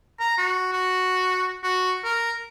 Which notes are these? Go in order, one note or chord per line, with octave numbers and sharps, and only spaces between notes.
A#5
F#4
F#4
F#4
A#4